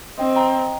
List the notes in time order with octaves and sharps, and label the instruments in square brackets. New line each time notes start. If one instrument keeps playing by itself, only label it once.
[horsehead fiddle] C4 [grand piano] D#5 G5
[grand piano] G5 A#5